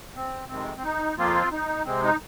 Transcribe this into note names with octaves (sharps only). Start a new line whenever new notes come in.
C4
F2 C3 D#3 G#3 C4
C4
D#4
F2 F3 A#3 C4 F4
D#4
C3 G#3 C4
D#4